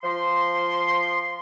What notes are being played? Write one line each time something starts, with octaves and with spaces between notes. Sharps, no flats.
F3 C6